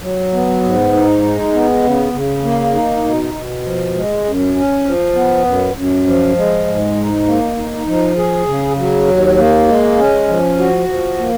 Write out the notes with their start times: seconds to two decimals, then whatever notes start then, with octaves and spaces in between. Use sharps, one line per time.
0.02 F#3
0.33 B3
0.63 G#2
0.93 D#4
1.22 G#3
1.53 B3
1.83 C#3
2.13 C#3
2.43 A#3
2.74 D#4
3.04 B2
3.34 B2
3.64 F3
3.94 G#3
4.25 F#2
4.55 C#4
4.85 F3
5.15 B3
5.45 F#2
5.75 F#2
6.06 F3
6.36 G#3
6.67 G#2
6.97 D#4
7.27 A#3
7.57 D#4
7.87 F3
8.17 G#4
8.47 C#3
8.78 F#3
9.07 D#2
9.37 A#3
9.68 G#3
9.98 C#4
10.28 F3
10.58 F#4
10.88 F3
11.18 A#3